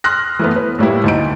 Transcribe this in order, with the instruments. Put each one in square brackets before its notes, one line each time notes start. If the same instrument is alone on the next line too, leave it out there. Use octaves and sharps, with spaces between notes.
[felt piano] C6 D#6 F6 F#6 A#6
E3 A3 B3
B4
A2 G3 A#3 E4
D2 D#4 D7